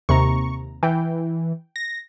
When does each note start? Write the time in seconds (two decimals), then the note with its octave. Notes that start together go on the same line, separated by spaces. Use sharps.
0.09 D#2 C3 A#5 C#6
0.83 E3 G5
1.76 A#6